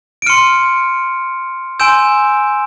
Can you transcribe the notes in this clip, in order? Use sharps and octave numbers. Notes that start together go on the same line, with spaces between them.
D7
C6 F6 C#7 D#7
G#5 C6 E6 G6 D7 E7